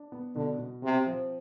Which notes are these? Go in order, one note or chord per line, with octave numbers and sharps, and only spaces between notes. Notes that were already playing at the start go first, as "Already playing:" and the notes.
Already playing: D4
B3
B2 D3
B2
C3 C4
F3